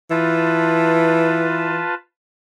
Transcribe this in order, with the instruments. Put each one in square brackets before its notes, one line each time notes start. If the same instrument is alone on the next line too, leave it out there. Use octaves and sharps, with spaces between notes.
[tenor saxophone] E3 [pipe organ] F4 B4 A5